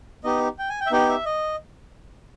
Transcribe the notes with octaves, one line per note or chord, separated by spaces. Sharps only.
B3 D#4 G4 D#5
G5
G#5
G5
E5
B3 D#4 G4 G5
E5
D#5